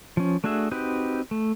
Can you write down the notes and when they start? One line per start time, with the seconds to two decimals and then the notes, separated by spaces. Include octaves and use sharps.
0.17 F3 C#4
0.44 A3 D4 F#4 G#4 E5
0.71 C4 D#4 F#4 G4 B4
1.31 A3